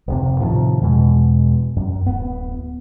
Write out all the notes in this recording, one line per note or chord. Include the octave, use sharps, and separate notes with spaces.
F1 D2 C3
A2 C3 D#3 F3
E2 B2 G#3
F#2
D1 B3